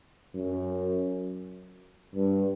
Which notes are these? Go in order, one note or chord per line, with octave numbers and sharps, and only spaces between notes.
F#2
G2